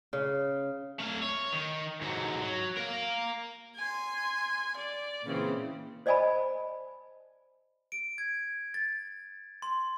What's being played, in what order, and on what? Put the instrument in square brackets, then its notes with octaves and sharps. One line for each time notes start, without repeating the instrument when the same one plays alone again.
[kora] C#3
[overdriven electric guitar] A3 F5
C#5
D#3
G#2 F#3
F#3
A#4 F5
[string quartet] G#5 C6
D5
A#2 C#3 E3 C4
[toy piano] C5 D5 D#5 G#5 A5 B5
[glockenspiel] D7
G#6
A6
C6